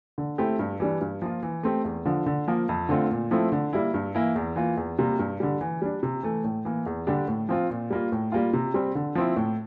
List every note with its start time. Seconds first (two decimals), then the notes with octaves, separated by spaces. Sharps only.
0.18 D3
0.38 A3 C4 E4 G4
0.59 G2
0.80 E3 G3 D4
1.01 G2
1.22 F3 A#3 F4
1.43 E3
1.63 A3 C4 G4
1.85 E2
2.05 D3 F3
2.26 D3
2.48 F3 A#3
2.69 F2
2.89 D3 A3 C4 F4
3.11 A#2
3.31 F3 A3 C4 E4
3.52 D3
3.73 G3 A#3 E4
3.94 G2
4.15 E3 A#3 E4
4.36 E2
4.56 E3 A#3 F4
4.77 E2
4.99 C3 G3 A#3
5.19 G2
5.40 D3 G3
5.61 E3
5.82 G3 D4
6.03 C3
6.23 E3 A3
6.44 A2
6.65 E3 A#3
6.86 E2
7.07 D3 G3 D4 G4
7.28 A2
7.49 F3 C4 F4
7.70 A#2
7.90 G3 A#3 F4
8.12 A2
8.32 G3 A#3 F4
8.53 C3
8.74 G3 C4
8.95 D3
9.15 F3 C4 E4
9.36 A2